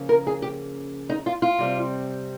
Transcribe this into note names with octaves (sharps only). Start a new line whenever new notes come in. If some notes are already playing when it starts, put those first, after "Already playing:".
Already playing: C#3 F3 A#3 C#4
A#4
G#4
G4
D#4
F4
F4
C3 G3 C4